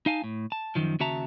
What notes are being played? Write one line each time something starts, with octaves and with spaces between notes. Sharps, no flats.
D#4 F5 G#5 A5
A2
A5
F#2 D#3 F3
D#2 C#3 F#4 E5 A5 A#5